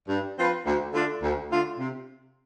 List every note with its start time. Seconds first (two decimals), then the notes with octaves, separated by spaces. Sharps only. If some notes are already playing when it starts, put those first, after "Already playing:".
0.08 G2
0.38 F3 C4 F4 B4
0.65 D2
0.93 D3 A3 D4 F4
1.22 D2
1.50 D3 A3 D4 F4
1.78 C3